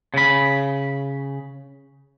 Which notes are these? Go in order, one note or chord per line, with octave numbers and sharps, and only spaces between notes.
C#3 B5